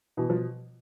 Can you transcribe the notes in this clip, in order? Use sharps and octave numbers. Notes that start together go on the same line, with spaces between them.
B2 E3
F3